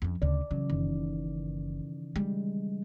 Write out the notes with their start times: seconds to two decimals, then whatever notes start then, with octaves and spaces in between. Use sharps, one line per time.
0.02 F2 C#4
0.22 D2 C#3 D5
0.51 C#3 E3 F#3
0.70 F#1 D#3 E3
2.16 G3 G#3